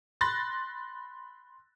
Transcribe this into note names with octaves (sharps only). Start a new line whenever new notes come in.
B5 C6 F#6 A6 A#6